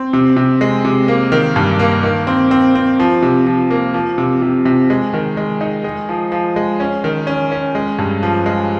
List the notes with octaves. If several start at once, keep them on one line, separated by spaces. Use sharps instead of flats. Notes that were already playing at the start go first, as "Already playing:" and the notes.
Already playing: C4
C3
C3
G#3
C3
A#3
D#3
G2
A#3
D#3
C4
C4
C4
F3
C3
F3
A#3
F3
C3
C3
C3
G#3
D#3
G#3
D#4
G#3
F3
F3
G#3
C#4
D#3
C#4
C#4
G#3
G2
F3
G#3